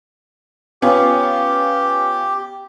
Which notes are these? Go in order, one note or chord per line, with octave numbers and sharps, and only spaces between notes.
B3 C#4 F4 G4